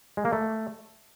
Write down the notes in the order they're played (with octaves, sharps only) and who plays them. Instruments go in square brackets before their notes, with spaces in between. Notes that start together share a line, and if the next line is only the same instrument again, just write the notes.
[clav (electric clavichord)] G#3
A#3
A3